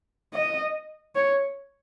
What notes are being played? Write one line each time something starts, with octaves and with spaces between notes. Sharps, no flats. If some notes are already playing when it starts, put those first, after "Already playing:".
D#5
C#5